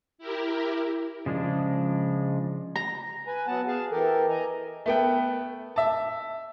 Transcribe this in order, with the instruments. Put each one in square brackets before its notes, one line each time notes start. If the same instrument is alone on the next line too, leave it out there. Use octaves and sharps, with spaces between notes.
[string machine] E4 G4 A#4
[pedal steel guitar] C#3 F3 G#3 D4
[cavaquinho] A#5
[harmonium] B4 G#5
F#3 B3 F#5 A5
G#4 F5 A5
E3 G4 A4 A#4
D#5 G#5 A#5
[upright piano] A3 B3 G5
E5 A5